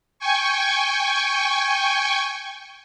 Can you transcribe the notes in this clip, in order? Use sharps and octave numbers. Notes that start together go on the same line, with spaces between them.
G5 G#5 C#6